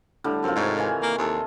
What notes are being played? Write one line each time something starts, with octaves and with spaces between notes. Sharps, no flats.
A2 D3 G3
F#2 C4 F4
G#2 C3 D#3 C#5
D#3 E3 G#5
A#3
D#2 A4 D#5 C6